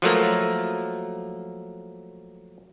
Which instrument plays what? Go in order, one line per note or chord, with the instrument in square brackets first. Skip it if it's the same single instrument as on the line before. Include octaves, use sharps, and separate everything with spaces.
[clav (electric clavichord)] F3 F#3 A3 A#3